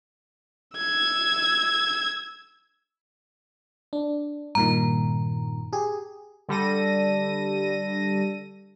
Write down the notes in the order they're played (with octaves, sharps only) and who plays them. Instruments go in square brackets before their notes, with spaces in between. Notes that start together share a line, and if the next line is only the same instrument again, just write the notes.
[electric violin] E6 G#6
[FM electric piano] D4
[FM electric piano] G2 A#2 D#3 [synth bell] A#5
[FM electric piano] G4 G#4
[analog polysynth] D3 G3 A4 A#6 D#7